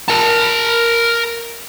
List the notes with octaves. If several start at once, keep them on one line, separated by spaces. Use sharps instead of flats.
A#4 A5